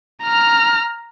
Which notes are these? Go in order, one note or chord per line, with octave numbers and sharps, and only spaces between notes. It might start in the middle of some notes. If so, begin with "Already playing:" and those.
A#5 F6